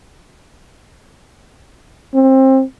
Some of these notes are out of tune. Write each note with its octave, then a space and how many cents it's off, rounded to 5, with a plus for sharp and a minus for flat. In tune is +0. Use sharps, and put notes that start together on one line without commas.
C4 +25